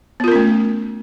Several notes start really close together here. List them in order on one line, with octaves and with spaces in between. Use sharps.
B3 F4 A#4 C#4 A3